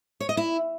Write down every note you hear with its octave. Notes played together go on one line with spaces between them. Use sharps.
C#5
D#5
E4